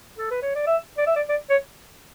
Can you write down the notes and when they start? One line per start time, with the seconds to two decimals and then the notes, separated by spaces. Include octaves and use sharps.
0.18 A4
0.31 B4
0.42 C#5
0.55 D5
0.67 E5
0.98 D5
1.07 E5
1.16 D5
1.29 D5
1.50 C#5